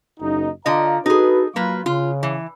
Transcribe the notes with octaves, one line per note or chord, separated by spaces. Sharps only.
F#1 D#4
D3 F4 D#5 F5 A#5
D#4 F#4 G#4 A4 B4
F#3 A#3 F4 B4
C#3 F4
E3